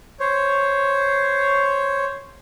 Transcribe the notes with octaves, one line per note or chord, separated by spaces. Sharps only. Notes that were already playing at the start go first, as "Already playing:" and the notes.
C5 C#5